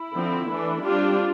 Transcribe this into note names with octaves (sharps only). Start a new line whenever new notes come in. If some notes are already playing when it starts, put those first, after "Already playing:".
Already playing: E4
D3 F3 C4
E3 A3 D4
G3 C4 D4 F4